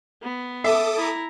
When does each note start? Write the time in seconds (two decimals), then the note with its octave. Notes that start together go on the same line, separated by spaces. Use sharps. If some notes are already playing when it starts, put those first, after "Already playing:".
0.23 B3
0.64 A4 E5 D6 D#6
0.97 E4 A#5